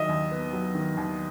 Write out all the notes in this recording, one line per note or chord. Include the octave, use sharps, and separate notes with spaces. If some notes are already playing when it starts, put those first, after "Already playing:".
Already playing: D#3 F#3 D#5 E5
D#2
B3
F#3
D#3
D#2